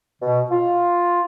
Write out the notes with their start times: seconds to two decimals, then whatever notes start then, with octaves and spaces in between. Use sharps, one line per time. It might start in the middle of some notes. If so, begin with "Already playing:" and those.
0.22 B2
0.51 F4